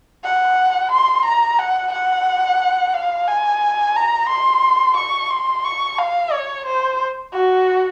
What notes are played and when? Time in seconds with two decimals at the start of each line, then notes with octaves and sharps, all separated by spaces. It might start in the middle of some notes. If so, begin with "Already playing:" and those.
0.24 F#5
0.92 C6
1.26 A#5
1.59 F#5
1.92 F#5
2.95 F5
3.28 G#5
3.96 A#5
4.29 C6
4.97 C#6
5.30 C6
5.65 C#6
5.98 F5
6.33 C#5
6.66 C5
7.34 F#4